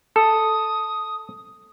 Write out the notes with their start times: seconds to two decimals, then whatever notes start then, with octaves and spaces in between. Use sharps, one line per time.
0.16 A4 D#6